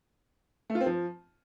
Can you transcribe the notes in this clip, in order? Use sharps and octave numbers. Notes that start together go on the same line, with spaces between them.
A3
F4
C4
F3